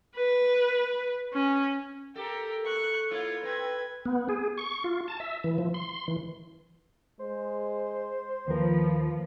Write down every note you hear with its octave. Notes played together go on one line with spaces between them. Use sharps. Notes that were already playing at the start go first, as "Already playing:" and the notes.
B4
C#4
G4 A4 A#4
C#6 F#6
A#3 E4 F4 C#5
C4 B4 G#6
B3
G#4
C#6
F4
A5
E5
E3
F3
C6
E3
G#3 C5
D#2 F3 A#4 B4